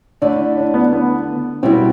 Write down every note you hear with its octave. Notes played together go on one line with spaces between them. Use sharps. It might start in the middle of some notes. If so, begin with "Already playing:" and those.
D3 A3 D4 E4
D4
B3
B3
B2 G3 B3 C4 E4